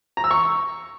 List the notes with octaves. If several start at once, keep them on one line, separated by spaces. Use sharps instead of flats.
A#5
E6
C#6